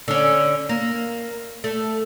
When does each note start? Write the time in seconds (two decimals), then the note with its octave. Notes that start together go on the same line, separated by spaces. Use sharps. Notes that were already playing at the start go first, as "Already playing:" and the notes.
0.08 D3 C#4
0.69 A#3
1.64 A3